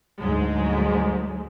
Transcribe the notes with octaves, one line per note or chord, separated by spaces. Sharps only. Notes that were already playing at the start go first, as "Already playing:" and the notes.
D2 G#2 F#3 G#3